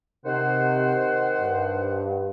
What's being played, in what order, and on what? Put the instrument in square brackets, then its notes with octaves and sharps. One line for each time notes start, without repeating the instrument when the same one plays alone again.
[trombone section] C3 [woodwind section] D#3 C5 F#5
[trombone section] G2